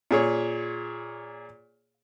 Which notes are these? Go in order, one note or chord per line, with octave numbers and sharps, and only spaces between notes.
A#2 G#4 C#5